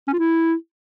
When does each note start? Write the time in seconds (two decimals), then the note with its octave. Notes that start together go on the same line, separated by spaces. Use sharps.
0.08 C#4
0.13 F4
0.19 E4